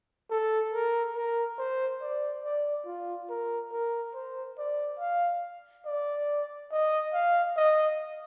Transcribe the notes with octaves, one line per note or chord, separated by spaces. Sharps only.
A4
A#4
A#4
C5
D5
D5
F4
A#4
A#4
C5
D5
F5
D5
D#5
F5
D#5